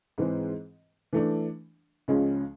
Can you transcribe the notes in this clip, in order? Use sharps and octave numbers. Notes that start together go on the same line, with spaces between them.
G#2 E3 G#3 C4
E3 A3 D4
C#2 C#3 F3 G#3 C#4